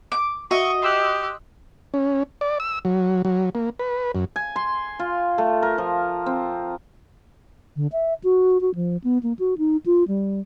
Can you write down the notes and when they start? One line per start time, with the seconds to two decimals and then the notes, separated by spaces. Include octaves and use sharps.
0.12 D6
0.51 F#4 D#5 E5 C#6
0.82 G4 C6 E6 F#6
1.94 C#4
2.41 D5
2.60 E6
2.85 F#3
3.25 F#3
3.55 A#3
3.79 B4
4.15 F#2
4.36 G#5
4.56 C6
4.99 F4
5.38 A3
5.62 A#4
5.78 F3
6.26 C4
7.76 D3
7.92 E5
8.24 F#4
8.61 F#4
8.75 F3
9.04 B3
9.23 A#3
9.39 F#4
9.58 D#4
9.86 F4
10.08 G3